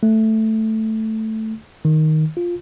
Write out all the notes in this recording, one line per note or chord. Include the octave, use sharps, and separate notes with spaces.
A3
D#3
F4